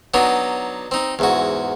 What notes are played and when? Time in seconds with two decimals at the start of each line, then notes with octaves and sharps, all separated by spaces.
0.14 F#3 B3 D4 D#4
0.91 C4 D#4
1.19 E2 G#2 F#4